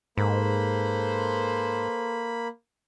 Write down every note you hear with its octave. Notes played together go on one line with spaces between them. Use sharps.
G#2 A#3 A4 B4 C5 B5